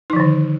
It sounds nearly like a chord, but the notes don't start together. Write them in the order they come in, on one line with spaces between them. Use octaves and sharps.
D#4 F3 D#3 D3